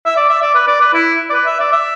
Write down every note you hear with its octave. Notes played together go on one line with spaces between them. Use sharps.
E5
D5
E5
D5
B4
D5
B4
E4
D5
B4
E5
D5
E5